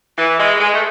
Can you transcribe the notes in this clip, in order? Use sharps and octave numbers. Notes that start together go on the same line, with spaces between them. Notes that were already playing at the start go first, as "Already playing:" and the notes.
E3
G#3
G#3
A3